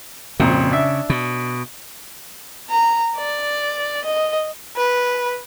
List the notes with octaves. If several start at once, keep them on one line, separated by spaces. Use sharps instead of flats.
G#1 F2 A#2 C#3
D4 E5
B2
A#5
D5
D#5
B4